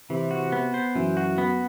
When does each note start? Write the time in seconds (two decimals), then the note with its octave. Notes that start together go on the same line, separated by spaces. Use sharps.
0.10 C3 E3
0.31 F#4
0.52 B3
0.74 C5
0.95 F#2 E3
1.17 F#4
1.38 B3